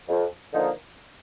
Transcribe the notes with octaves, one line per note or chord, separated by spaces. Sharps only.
F2
D3 F3 A#3 D#4